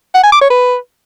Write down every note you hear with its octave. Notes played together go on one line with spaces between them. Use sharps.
F#5
G#5
D6
C#5
B4